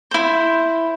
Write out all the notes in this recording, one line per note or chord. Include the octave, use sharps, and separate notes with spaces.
E4 C5